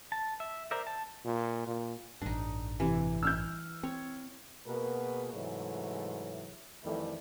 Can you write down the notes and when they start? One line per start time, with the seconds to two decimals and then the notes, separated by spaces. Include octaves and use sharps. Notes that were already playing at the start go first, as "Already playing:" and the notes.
0.12 A5
0.40 E5
0.71 A#4 C5 D5 E5
0.87 A5
1.25 A#2
1.67 A#2
2.22 A1 G2 D4 D#4
2.80 C3 E3
3.23 E6 F6 G6
3.83 C4 C#5
4.66 B2 A#3 F#4 G#4 A#4 B4
5.32 G#2 C3 E3 F#3 G#3 A3
6.83 F2 D#3 E3 G3 A3 E4